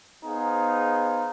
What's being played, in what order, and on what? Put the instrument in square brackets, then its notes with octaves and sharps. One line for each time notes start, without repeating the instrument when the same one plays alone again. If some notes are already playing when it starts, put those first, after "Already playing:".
[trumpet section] B3 D#4 G#4 C5 F5